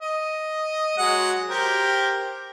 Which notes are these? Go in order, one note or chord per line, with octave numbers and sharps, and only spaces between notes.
D#5
F#3 G#3 F#5
G4 A#4 C5